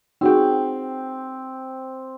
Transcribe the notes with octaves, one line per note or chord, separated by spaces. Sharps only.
C4 D#4 F#4 G#4 G5